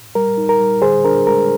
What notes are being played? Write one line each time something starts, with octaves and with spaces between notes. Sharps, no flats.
G3 A#4
D#4
A#4
G3
D3 G#4 C5
D4 A#4
G#3 A#4